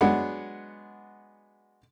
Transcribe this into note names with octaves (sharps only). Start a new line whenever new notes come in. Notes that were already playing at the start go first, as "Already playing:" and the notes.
F#3 G#3 B3 D4 F#5